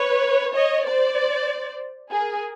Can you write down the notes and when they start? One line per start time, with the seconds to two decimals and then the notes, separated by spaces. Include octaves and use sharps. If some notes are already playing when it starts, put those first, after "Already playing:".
Already playing: B4 C#5
0.55 C#5 D#5
0.87 C5 D5
2.11 G#4 A#4